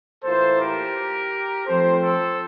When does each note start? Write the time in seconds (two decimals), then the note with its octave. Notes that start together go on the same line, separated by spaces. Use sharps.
0.23 A2 E3 A#3 F4 A4 C5
0.59 G4 A#4
1.66 F3 A3 C4 F4 A4 C5
2.02 A4 C5